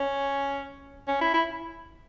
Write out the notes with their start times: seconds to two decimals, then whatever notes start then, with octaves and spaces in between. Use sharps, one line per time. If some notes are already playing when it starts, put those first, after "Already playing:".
Already playing: C#4
1.08 C#4
1.21 E4
1.34 E4